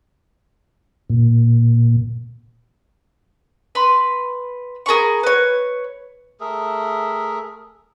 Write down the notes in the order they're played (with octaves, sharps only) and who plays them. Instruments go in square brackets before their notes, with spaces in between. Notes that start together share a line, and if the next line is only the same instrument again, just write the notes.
[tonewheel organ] A#2
[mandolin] B4 B5 C6
G#4 A#4 B5 C#6
B4 C#5
[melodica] A3 G#4 A#4 E5